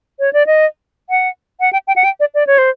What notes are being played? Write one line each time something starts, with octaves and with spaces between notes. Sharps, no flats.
C#5
D5
D#5
F#5
F#5
G5
G5
F#5
G5
D5
D5
C#5
C5